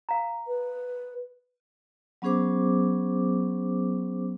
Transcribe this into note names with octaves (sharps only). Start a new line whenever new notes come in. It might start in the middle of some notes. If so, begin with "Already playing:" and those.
A#4 F5 A#5
B4
F#3 B3 C#4 G#4 C5 D6